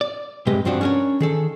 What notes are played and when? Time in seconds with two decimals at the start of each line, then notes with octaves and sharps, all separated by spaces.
0.01 D5
0.47 G2 C3 G#3 G4 B4 D#5
0.65 G2 F3 C4 D4 F#4
0.81 C#4 D4 G#4 A#4 C#5
1.20 D#3 G#4 A4